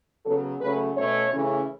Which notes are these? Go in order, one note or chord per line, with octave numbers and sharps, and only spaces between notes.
C#3 F#3 B3 A4
C#3 F#3 A3 C#4 B4
B2 A3 C#4 C#5
C#3 E3 A3 C#4